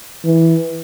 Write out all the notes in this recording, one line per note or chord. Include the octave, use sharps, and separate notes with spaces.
E3